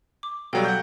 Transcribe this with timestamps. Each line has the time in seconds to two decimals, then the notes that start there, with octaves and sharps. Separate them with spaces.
0.23 D6
0.53 B2 F#3 G3 A4 F5 G5
0.65 F#5 G6